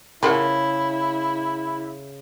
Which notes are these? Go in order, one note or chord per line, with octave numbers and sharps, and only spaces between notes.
C#3 F3 E4 A#4 F#5